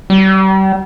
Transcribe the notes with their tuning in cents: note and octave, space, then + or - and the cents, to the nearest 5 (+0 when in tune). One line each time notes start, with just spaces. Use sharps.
G3 -35